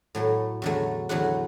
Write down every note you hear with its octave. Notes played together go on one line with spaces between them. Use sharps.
A2 F#3 A3
E2 D3 F#3 A3
E2 D3 F#3 A3 F#5